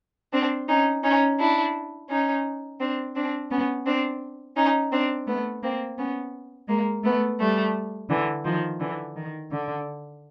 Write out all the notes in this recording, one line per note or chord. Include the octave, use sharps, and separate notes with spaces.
C4 D4
C#4 D#4
C#4 D#4
D4 E4
C#4 D#4
C4 D4
C4 D4
B3 C#4
C4 D4
C#4 D#4
C4 D4
A3 B3
A#3 C4
B3 C#4
G#3 A#3
A3 B3
G3 A3
D3 E3
D#3 F3
D3 E3
D#3
D3